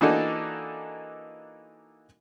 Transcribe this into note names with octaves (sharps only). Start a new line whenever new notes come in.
E3 A#3 D4 D#4 F#4 A4